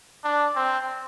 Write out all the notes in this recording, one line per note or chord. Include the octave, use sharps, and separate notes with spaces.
D4
C4